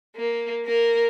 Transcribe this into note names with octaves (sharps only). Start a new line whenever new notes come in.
A#3
A#3 A#4